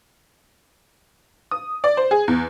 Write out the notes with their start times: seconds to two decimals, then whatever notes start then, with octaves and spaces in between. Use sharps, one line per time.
1.51 D#6
1.84 D5
1.97 C5
2.11 G#4
2.28 E2